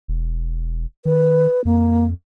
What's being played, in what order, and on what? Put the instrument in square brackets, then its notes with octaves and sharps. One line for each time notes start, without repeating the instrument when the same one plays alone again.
[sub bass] E1
[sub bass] D#3 [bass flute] B4
[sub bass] F2 [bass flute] A#3